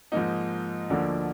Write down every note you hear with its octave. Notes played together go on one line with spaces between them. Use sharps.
G#2 F3 A#3 D#4
D2 D3 F3 A#3 D4